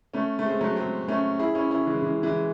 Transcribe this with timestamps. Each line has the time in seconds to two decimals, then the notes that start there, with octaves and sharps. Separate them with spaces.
0.14 A3 C#4
0.39 A3
0.45 G#3 C4
0.61 F#3 A3
0.76 G#3 C4
1.08 A3 C#4
1.39 E4 G#4
1.55 C#4 E4
1.71 C#4 E4
1.86 E3 G#3
2.02 E3 G#3
2.23 E3 G#3